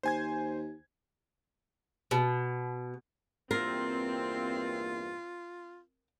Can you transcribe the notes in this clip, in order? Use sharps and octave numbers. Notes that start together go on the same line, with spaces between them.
D#2 C5 G#5 G#6
B2
E2 G2 A#3 C4 F4 A#4